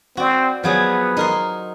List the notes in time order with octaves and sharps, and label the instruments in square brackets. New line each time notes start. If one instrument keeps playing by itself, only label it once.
[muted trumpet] C4 [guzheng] F#4 D5
[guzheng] F3 F#3 G#4 [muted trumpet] B3
[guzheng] D#4 A#4 C6